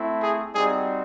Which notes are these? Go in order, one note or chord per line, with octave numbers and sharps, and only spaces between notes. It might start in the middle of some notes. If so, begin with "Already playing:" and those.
Already playing: A3 C4 E4
G#4
G3 C4 D#4 F#4 G#4